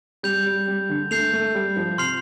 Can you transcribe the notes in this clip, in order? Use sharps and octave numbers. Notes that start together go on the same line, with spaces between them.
G3 G6 F7
G3
G3
D3
A3 G6 C7 F7
A3
G3
F3
C3 C6 F6 C7 F7